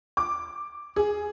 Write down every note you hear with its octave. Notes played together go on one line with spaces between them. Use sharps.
D6
G#4